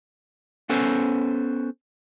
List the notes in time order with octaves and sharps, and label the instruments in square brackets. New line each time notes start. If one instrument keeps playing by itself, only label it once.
[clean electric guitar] B3 C#4 A4 B4 C5